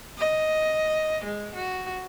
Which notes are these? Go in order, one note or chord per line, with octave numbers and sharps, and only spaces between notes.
D#5
G#3
F#4